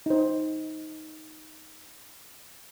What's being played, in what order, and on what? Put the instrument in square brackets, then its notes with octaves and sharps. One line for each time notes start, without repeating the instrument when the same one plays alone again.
[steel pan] D#4 C5